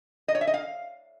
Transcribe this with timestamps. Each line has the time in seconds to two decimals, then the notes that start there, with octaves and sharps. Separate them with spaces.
0.28 D#5
0.35 C#5
0.41 E5
0.47 D#5
0.54 F5